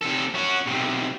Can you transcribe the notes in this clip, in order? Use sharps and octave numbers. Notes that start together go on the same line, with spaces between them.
C3 A4
C#4 F#4
B1 C3